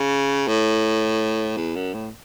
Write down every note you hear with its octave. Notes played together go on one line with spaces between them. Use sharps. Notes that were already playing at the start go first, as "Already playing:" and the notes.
Already playing: C#3
A2
E2
F#2
A2